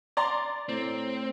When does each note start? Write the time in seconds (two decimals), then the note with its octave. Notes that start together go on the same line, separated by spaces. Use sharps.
0.17 D5 A#5 C6
0.69 A2 C4